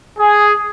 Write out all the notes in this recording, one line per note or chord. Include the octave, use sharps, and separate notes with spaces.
G#4